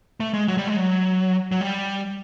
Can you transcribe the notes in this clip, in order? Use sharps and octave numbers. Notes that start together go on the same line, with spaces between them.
A3
G#3
F#3
G3
G#3
F#3
F#3
G3